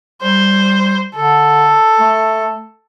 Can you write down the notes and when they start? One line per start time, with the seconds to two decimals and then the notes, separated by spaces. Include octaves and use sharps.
0.22 G3 C5
1.15 D3 A4
2.00 A3